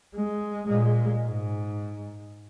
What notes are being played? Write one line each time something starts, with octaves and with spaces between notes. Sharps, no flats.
G#3
A#2 G#3
G#2